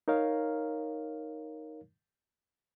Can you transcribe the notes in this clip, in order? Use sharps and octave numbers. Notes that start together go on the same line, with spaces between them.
D#4 A#4 C#5 F5